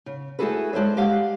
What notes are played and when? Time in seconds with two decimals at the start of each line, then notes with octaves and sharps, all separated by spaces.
0.06 C#3
0.39 A3 E4 F#4 G#4 A4 B4
0.73 G#3 D4 C5 C#5 E5
0.96 G#3 G4 D#5 F5 F#5